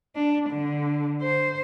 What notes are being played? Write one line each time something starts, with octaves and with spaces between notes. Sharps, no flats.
D4
D3
C5